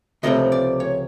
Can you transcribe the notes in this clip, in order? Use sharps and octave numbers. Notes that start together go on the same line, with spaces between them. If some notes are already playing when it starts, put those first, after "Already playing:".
C#2 C3 F3 A3 C4 D#5
D5
C#5